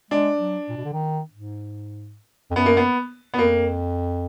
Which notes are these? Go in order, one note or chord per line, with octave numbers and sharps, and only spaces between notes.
G#3 D4
F#3
A#2
B2
D3
D#3
G#2
F2
F#2 B3
A#3
B3
B3
F2 A#3